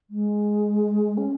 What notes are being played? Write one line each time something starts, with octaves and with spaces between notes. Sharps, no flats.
G#3
C#4